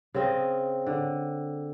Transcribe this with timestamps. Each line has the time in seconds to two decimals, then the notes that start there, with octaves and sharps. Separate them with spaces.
0.14 C#3 C4 D#5
0.86 D3